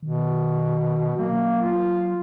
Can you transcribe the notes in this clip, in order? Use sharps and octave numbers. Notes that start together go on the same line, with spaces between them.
B2 D#3
F#3 A#3
F4